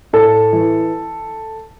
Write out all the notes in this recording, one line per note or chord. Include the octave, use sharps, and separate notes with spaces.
A2 A4
E3